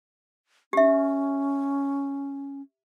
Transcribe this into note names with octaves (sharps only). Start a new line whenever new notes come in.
C#4 G4 E5